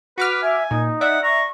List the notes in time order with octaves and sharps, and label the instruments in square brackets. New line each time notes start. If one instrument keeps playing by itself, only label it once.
[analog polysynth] F#4 D6 F6 [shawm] B4
[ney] E5 [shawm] G#5
[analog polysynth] A#2 [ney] D#4
[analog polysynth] D5 E5 [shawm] F#5
[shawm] A#5 [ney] C#6